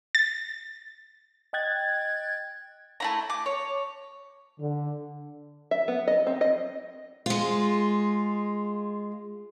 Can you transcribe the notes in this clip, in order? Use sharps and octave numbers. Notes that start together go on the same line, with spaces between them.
A6
D#5 G5 F#6 G#6 A6
A3 E4 A#5
D6
C#5
D3
E5
B3
D#5
C4
D#5
G#3 F4